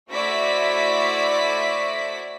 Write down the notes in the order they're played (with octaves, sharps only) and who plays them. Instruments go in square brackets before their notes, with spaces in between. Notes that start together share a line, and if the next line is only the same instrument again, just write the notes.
[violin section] A3 E4 F#4 C5 D5 B6